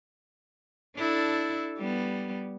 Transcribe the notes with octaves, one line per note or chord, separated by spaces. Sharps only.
D4 E4 A4
G3 B3